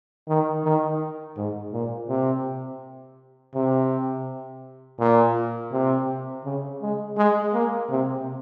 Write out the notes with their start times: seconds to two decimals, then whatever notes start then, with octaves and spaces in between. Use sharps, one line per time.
0.28 D#3
0.64 D#3
1.37 G#2
1.72 A#2
2.09 C3
3.54 C3
4.99 A#2
5.72 C3
6.45 C#3
6.82 G#3
7.17 G#3
7.53 A#3
7.90 C3